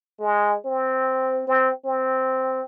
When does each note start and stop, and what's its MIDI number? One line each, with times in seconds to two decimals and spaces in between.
0.20 0.55 56
0.65 1.43 60
1.48 1.70 60
1.85 2.62 60